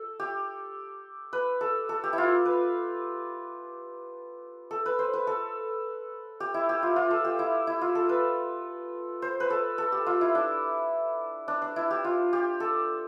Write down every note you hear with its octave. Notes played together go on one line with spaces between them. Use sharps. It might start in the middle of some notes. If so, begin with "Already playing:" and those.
Already playing: A4
G4
B4
A4
A4
G4
E4
F4
B4
A4
B4
C5
B4
A4
G4
E4
G4
F4
F4
A4
G4
E4
E4
F4
A4
B4
C5
B4
A4
A4
G4
F4
E4
D4
D4
D4
E4
G4
F4
G4
A4